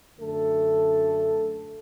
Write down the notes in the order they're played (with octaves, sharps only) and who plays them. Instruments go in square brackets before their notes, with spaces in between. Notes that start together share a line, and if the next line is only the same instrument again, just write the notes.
[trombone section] F#2 D3 A3 A4